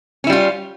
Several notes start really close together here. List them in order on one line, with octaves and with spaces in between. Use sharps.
C#4 E4 G3 F4